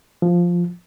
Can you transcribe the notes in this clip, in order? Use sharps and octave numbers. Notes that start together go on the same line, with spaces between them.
F3